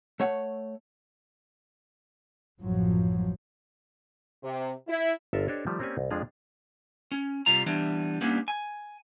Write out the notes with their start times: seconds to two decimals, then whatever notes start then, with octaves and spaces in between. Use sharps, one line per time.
0.20 A3 C#5 F#5
2.59 A1 F#2 F3 F#3
4.43 C3
4.88 E4
5.33 G1 F4 A4 A#4 E5 F5
5.48 D4 G4 A4 C5 C#5 D#5
5.67 D#3 F3 G3 A3
5.79 A#3 C4 C#4 G4 D5 G#5
5.98 C2
6.10 F2 F3 G#3 D4 G#4 F5
7.12 C#4
7.46 C3 G3 F4 A#5
7.66 E3 G3 B3 D4
8.21 G3 A#3 B3 C#4 D4
8.48 G#5